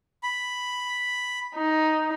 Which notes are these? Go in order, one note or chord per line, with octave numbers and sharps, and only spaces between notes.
B5
D#4